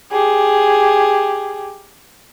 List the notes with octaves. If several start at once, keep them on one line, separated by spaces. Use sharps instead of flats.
G4 G#4